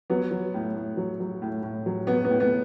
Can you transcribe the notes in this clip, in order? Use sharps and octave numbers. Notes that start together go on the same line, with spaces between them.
F#3 B3
F#3
A2
A2
F#3
F#3
A2
A2
F#3
F#3 B3
B3
A2
B3